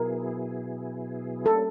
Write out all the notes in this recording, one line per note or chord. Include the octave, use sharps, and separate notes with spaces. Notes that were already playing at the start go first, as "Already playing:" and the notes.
Already playing: B2 F#3 B3 E4 G#4 A#4
G3 A#3 C#4 A4